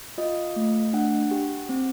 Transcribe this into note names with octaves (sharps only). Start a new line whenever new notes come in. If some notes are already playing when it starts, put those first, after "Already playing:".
F4 D#5
A3
D4 F#5
G4
C4